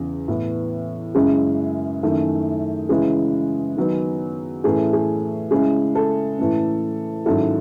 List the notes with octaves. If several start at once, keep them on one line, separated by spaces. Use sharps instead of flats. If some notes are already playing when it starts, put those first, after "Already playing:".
Already playing: E2 C#3
A2 E3 B3 E4
F#2 C#3 G#3 C#4 E4 G#4
F#2 D#3 A3 E4
C#3 E3 G#3 C#4 E4 G#4
D#3 F#3 B3 D#4
A2 E3 A3 C#4 E4 G#4
G#4
C#3 G#3 C#4 E4 G#4
A4
A2 E3 A3 C#4
G#2 D#3 F#3 C#4 E4 A4